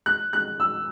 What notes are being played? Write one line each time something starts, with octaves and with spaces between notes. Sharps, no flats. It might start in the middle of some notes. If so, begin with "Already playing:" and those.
F#6
F#6
E6